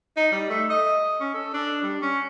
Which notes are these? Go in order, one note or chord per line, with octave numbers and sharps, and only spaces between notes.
D#4
G3
A3
D#5
C#4
A4
D4
G3
C#4